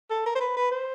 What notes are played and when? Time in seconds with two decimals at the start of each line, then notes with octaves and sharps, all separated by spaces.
0.10 A4
0.26 A#4
0.35 C5
0.40 B4
0.56 B4
0.71 C5